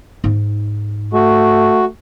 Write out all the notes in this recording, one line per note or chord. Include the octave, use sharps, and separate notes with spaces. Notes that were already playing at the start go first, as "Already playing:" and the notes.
G#2 D#4
A3 F#4